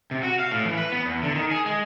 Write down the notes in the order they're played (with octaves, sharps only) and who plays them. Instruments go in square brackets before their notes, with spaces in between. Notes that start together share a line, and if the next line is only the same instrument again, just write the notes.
[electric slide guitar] C3
F#4
F5
A2
E3
B4
B3
E2
D3
D#3
G#4
G#3